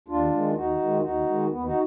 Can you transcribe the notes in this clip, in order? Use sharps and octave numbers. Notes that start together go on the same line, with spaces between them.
D#2 D4 F4
D#3 G#3
D#2 D#4 F#4
D#3 G#3
F4
D#2 D#4 F#4
D#3 G#3
D#2 B3
D#4 F#4